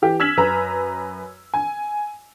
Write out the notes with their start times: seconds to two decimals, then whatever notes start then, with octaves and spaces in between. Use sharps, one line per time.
0.02 E3 G4
0.20 E6 F6 G#6 B6 E7 F#7
0.37 F#2 B4 A#5
1.54 G#5